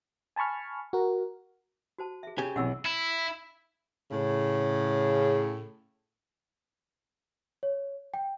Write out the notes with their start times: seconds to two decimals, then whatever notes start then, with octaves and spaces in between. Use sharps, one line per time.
0.36 G#5 A5 B5 C#6 F6
0.93 F#4 A#4
1.98 F#4 C5 A5
2.23 G#4 E5
2.38 C#3 G4 G#5
2.56 B1 C3 E3 F#5 E6
2.85 E4
4.11 A2 C#3
7.63 C#5
8.14 G5